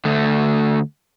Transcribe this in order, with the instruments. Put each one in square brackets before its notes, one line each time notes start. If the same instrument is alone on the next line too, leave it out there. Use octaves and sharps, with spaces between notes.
[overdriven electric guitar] D2 A3